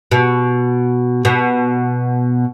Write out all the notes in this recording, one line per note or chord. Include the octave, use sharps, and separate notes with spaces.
B2
B2